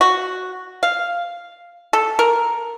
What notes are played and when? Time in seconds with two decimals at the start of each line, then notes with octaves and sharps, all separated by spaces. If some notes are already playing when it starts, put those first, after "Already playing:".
0.01 F#4
0.83 F5
1.93 A4
2.19 A#4